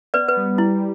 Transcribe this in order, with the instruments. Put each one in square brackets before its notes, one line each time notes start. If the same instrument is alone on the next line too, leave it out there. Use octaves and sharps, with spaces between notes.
[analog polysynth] B3 [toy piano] B4 D5
[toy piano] B4
[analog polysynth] G3
[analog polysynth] G3 [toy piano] E4